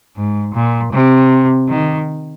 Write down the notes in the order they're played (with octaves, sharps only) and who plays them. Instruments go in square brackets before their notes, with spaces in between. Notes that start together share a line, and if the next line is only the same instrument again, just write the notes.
[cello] G#2
A#2
C3
D#3